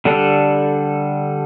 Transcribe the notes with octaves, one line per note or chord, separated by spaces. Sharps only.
D3 G3 D4 A4